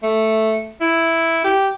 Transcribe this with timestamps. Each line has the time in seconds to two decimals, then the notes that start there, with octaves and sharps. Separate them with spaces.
0.03 A3
0.81 E4
1.44 G4